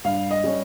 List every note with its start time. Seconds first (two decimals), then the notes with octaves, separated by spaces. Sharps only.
0.04 G2 F5
0.31 D#5
0.44 G3 C#4